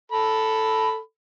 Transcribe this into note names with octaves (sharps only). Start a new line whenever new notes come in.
A4 B5